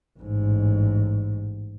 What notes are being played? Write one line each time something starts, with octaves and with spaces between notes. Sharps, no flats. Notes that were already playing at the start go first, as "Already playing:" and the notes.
A1 G#2